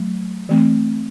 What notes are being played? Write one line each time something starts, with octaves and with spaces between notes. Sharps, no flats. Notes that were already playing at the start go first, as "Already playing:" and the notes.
Already playing: F#3 A3
E3 A3 C4